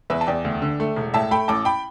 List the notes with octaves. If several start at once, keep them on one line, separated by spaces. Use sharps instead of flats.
E2 B4 E5
A5
E2 D5 G5
D2
D3
A3
E1
A2 E5 A5
A3 G5 B5
A1 A5 D6
G5 B5